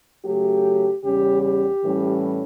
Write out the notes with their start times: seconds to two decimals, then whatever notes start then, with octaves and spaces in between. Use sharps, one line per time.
0.24 C#3 F#3 A3 G4
1.04 E2 C#3 G3 C#4 G4
1.43 G4
1.82 A2 E3 G3 C#4